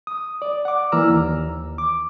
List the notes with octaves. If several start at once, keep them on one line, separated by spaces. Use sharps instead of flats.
D#6
D5
F#5 D6
E3 A#3 D5 A#5 E6 F6
D#2
D6